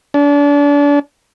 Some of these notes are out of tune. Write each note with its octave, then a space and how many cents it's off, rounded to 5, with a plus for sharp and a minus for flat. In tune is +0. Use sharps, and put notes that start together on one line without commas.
D4 -35